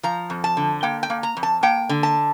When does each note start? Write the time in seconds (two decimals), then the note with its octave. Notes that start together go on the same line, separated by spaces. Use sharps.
0.03 F3 A#5
0.30 F2
0.44 A5
0.57 D3
0.83 A#3 G5
1.03 G5
1.10 A#3
1.23 A#5
1.37 F2
1.43 A5
1.63 A#3 G5
1.89 D3
2.03 A5